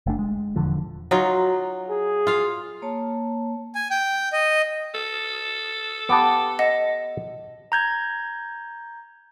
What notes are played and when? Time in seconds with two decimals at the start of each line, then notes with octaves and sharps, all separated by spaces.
0.06 F#1 A3 D4
0.19 G#3
0.56 D#1 E2 D3 F3
1.11 F#3 D#4 F4
1.90 G#4
2.27 F4 F5
2.82 A#3 C#5 A5
3.75 G#5
3.91 G5
4.33 D#5
4.94 A4
6.09 B3 G4 B4 A5 D6
6.59 D#5 F#5 A#6
7.72 A#5 G6 G#6